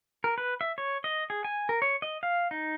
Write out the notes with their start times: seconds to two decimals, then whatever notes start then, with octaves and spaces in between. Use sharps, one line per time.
0.24 A#4
0.38 B4
0.61 E5
0.78 C#5
1.04 D#5
1.30 G#4
1.44 G#5
1.69 A#4
1.82 C#5
2.02 D#5
2.23 F5
2.51 D#4